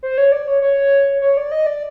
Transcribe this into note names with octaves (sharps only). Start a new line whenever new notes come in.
C5
C#5
D5
C#5
C#5
C#5
D5
D#5
D5